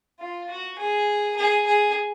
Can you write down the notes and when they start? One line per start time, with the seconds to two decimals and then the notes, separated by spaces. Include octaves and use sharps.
0.20 F4
0.50 F#4
0.79 G#4
1.37 G#4
1.67 G#4